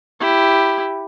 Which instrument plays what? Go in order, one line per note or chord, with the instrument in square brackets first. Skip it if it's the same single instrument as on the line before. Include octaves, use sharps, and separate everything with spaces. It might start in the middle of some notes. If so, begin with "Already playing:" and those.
[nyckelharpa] E4 G4